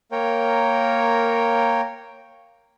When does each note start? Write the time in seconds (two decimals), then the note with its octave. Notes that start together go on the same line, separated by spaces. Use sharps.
0.12 A#3 A#4 C#5 G5